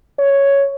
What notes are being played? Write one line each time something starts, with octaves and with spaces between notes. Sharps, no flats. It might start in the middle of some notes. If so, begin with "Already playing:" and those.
C#5